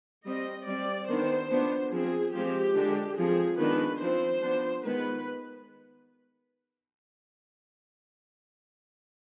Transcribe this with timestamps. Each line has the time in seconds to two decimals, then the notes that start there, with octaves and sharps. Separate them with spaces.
0.26 G3 C4 D#5
0.68 G3 C4 D5
1.09 D#3 B3 D4 C5
1.50 F3 B3 D4
1.93 F3 C4 G#4
2.34 F3 G#3 C4 G4
2.76 D3 G#3 D4
3.18 F3 C4 G#4
3.59 D#3 G#3 B3 D4 B4
4.01 F3 C4 C5
4.43 F3 B3 D4
4.84 D#3 G#3 B3 B4